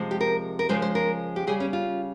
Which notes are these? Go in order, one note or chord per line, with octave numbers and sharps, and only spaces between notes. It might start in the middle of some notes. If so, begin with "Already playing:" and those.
Already playing: C3 F3 G#3
G4
A#4
A#4
C#3 F3 G#3 C5
C5
A#4
G4
C#3 G3 G#4
C#4
F4